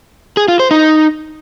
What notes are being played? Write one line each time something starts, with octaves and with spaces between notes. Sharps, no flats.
G#4
F4
C5
D#4